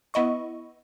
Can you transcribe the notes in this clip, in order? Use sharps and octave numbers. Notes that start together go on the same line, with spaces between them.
B3 E4 D#5 C#6